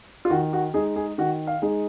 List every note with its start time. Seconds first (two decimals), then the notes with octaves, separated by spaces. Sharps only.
0.25 F4
0.30 D#3 F#4
0.53 F#4
0.74 G#3 D#4 G#4
0.96 G#4
1.18 D#3 F#4
1.47 F5
1.62 G#3 D#4